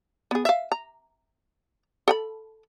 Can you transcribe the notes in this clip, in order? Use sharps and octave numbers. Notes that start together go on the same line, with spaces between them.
B3 G#4
E5 F5
A#5
A4 G5 B5